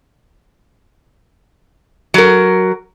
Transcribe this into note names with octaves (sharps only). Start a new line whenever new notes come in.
F#3 A#4